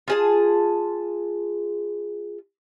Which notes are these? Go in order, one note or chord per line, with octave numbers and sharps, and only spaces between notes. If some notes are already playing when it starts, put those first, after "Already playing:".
F4 G#4 A5